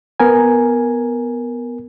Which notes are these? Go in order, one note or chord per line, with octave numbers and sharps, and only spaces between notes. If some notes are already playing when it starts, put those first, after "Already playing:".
B3 A#4 G#5